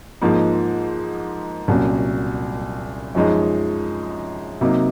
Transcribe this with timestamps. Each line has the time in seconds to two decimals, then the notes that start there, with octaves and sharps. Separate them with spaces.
0.22 G#2 F3 A#3 D#4
1.68 C2 A#2 F#3 C#4
3.15 F#2 F3 G#3 D#4
4.61 C3 F#3 A#3 D#4